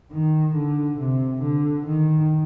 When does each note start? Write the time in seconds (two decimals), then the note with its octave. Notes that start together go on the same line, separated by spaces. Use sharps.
0.12 D#3
0.56 D3
0.99 C3
1.42 D3
1.86 D#3